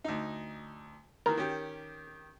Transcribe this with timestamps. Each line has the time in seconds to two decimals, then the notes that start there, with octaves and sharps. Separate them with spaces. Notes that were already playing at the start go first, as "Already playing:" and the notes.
0.04 D2 D#4
1.26 D#3 E3 A#4
1.37 D#3 C#4 G4